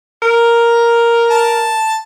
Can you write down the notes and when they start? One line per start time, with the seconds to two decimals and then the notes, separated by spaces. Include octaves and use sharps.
0.22 A#4
1.31 A5